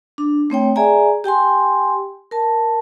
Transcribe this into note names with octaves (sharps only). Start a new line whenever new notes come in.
D4
A3 C4 C#5 G5
G#4 D5 E5 G#5 A#5
G4 G5 G#5 C6
A#4 A5